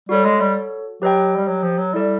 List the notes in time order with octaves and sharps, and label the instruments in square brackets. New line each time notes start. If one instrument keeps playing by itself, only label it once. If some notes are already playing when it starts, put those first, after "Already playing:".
[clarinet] G3 [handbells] F#4 A4 C#5
[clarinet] G#3
G3
[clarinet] F#3 [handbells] G4 B4 D#5 G5
[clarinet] G3
F#3
F3
F#3
[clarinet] G3 [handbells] E4 A4 D5